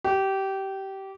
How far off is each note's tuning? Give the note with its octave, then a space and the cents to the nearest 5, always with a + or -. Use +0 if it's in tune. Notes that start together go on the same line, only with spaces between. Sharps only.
G4 -20